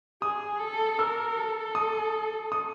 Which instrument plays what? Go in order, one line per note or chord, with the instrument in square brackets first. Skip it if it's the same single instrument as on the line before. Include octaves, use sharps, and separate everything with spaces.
[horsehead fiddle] G#4 [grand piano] D#6
[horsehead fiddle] A4
[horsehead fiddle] A#4 [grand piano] E6
[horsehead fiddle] A4
[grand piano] D#6
D#6